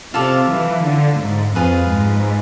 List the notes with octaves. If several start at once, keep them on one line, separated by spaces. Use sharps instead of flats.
C3 F4 A4 D5 F5
E3
D3
G#2
F2 F4 G#4 B4
G#2